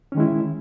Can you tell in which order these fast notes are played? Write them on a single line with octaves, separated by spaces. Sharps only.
C#4 D#3 G#3 E4